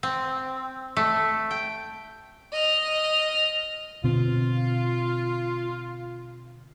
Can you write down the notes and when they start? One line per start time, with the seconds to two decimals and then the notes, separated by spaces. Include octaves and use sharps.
0.03 C4
0.97 A3
1.51 G5
2.52 D#5 F6
4.04 B2 D3 C4 F4